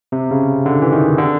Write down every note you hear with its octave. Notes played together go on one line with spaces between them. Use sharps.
C3
C#3
D3
E3
D#3
D3